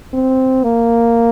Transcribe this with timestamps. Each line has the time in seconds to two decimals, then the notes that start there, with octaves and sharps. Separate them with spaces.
0.14 C4
0.64 A#3